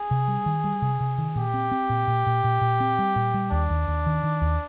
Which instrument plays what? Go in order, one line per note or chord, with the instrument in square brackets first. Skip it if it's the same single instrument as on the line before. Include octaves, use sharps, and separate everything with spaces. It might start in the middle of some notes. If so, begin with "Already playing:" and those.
Already playing: [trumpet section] G#4
[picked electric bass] C3
G3
D#3
G3
C3
C3
D#3
[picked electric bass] A#2 [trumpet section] G4
[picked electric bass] C4
C4
A#2
A#2
A#2
A#2
A#2
C4
G3
A#2
G3
[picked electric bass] D#2 [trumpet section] D4
[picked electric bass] D#2
D#2
D#3
D#3
D#2